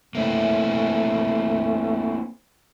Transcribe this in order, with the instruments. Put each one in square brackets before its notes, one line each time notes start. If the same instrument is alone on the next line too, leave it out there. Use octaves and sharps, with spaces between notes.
[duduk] A3 [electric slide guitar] A#3 C4 E4